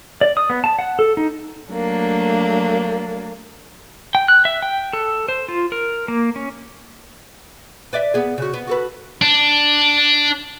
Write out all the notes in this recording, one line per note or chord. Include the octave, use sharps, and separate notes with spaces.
D5
D#6
B3
A5
F#5
A4
D#4
F#3 A3 A#3 D4
G5
F#6
E5
G5
A4
C5
F4
A#4
A#3
C#4
B4 D5 E5
B3 G#4
C#3 F#4
B3
F#4 A4 B4
D4